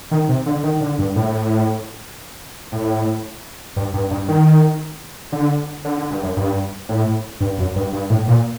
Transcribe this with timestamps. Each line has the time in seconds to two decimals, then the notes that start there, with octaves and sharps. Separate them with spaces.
0.11 D#3
0.29 C3
0.46 D3
0.63 D#3
0.81 D3
0.98 G2
1.16 A2
2.72 A2
3.76 G2
3.94 G2
4.11 G2
4.28 D#3
5.32 D3
5.85 D3
5.97 D3
6.11 G2
6.23 F#2
6.37 G2
6.89 A2
7.40 G2
7.58 F#2
7.76 G2
7.93 G2
8.10 A2
8.28 A#2